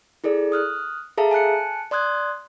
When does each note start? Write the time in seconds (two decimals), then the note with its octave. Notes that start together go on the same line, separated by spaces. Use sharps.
0.24 E4 G#4 A4 D5
0.52 D#6 F6 F#6
1.18 G#4 A4 E5 F5 A5 A#5
1.31 G#5 A5 F#6 C#7
1.91 D5 C6 D#6 F#6 G#6